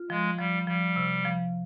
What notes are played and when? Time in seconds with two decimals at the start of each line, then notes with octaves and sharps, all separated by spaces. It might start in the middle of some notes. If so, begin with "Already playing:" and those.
Already playing: F4
0.10 F3 G#3
0.38 F3 G3
0.67 F3 G3
0.96 C3
1.25 F3